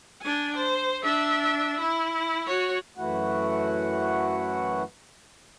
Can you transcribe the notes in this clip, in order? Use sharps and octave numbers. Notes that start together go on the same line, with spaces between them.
D4 G#5
C5
D4 E5
E4
F#4 C#5
F#2 E3 A3 E4 F#4 F#5